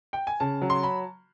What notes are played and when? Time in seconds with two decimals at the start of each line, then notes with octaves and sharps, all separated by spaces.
0.13 G5
0.27 G#5
0.40 C#3 A5
0.62 F#3
0.70 C6
0.83 B5